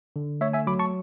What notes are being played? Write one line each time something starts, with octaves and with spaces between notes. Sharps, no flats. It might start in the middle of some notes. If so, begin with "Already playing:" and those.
D3
A3 C#5 E5
E5 G#5
F#3 B5 D6
A5 C#6